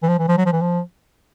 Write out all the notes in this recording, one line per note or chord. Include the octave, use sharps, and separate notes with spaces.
E3
F3
E3
F3
F#3
F3
E3
F3